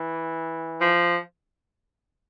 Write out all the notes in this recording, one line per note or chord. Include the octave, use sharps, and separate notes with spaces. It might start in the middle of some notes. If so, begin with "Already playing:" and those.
Already playing: E3
F3